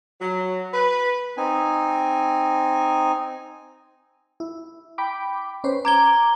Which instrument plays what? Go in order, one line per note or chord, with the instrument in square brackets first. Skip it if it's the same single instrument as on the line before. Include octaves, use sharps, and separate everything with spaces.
[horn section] F#3
B4
[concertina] C4 D#4 G#5
[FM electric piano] E4
G5 B5 D6
C#4 B4 C5
[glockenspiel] A#5 G#6 G7 [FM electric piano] D6